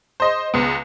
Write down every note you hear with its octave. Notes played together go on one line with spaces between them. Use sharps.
C5 D#5 C6
C#2 B3